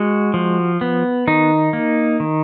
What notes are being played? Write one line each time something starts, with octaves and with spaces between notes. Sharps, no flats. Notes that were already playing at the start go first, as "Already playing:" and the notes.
Already playing: G#3 F#4
F3
B3
D#3 D#4
A#3
D#3